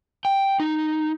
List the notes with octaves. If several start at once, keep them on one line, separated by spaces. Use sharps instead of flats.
G5
D#4